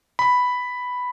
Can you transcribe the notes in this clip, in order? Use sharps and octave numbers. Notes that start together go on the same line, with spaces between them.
B5